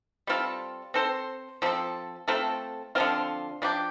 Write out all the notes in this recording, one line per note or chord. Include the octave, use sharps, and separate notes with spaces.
G3 C4 F4 A4
C4 A4 C5
F3 C4 A4
A3 C4 F4 A4
D3 F3 C4 F4
F3 D4 G4